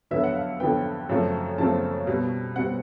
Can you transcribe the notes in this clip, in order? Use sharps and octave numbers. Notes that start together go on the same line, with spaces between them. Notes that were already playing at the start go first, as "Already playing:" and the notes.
F2 D3 F#3 B3 E5
F#5
F5
F2 D3 F#3 B3 G5
F#2 C#3 F3 A3 C4
F#2 C#3 F3 A3 C4 A5
B2 G3 C4
B2 G3 C4 F#5